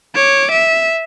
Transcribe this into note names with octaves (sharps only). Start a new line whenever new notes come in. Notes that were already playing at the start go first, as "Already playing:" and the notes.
C#5 D6
E5